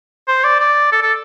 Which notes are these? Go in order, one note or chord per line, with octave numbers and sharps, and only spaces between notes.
C5
D5
D5
A4
A4